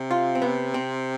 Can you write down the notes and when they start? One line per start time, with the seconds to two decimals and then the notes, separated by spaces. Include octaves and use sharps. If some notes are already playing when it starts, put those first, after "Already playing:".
Already playing: C3
0.11 F4
0.35 C4
0.42 B3
0.74 C4